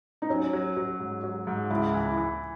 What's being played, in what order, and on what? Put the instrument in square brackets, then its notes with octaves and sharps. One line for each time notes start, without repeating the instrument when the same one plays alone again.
[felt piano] D#4
[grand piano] F#3 [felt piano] C#4
[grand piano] F#3
F#3
G#2
F#3
G#2
[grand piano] C#2 [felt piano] E4
[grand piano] E3
[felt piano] E4
[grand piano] E3